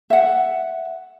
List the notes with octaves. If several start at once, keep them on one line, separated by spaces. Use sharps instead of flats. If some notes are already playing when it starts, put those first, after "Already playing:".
E5 F#5